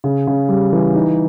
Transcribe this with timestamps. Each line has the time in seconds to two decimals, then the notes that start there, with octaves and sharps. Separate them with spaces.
0.04 C#3
0.27 C#3
0.49 G3
0.72 E3
0.95 D#4